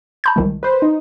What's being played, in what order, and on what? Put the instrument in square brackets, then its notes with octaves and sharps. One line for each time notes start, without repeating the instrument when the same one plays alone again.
[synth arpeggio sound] A5 B5 G6
C2 D#3 G#3
[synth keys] B4 C5
D#4